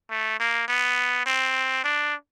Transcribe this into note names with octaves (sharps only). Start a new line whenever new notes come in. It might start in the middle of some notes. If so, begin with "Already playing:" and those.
A3
A#3
B3
C4
D4